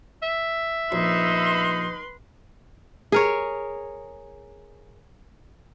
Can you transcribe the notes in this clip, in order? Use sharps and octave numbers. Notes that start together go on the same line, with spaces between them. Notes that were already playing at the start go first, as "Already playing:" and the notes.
E5
A#1 D#4 B4 C6
G#4 A#4 C#5